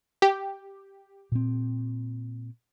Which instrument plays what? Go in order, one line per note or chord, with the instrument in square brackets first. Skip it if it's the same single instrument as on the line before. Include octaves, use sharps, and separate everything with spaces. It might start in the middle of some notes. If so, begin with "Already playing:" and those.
[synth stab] G4
[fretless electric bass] A#2 C4